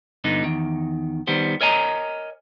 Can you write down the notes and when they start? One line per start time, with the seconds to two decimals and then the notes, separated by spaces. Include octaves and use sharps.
0.24 G2 D3 B3 D#4
0.44 E2 D#3
1.27 D#3 G3 B3 C5
1.61 A#4 C#5 D#5 G#5 A#5